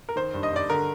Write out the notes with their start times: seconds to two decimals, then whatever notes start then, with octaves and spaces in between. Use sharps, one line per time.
0.09 A#4
0.16 D#3 C5
0.34 G2
0.43 D#5
0.52 G2 D5
0.70 D3 A#4